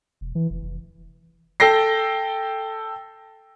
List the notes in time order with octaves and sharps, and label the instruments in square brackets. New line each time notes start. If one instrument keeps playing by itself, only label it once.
[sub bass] E1
E3
F1
F1
[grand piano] A4 G5 A#6 C7